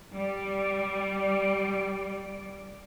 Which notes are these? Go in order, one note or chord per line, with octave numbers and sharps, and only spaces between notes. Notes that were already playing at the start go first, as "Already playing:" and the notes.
G3 D5